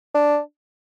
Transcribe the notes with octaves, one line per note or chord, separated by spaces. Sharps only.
D4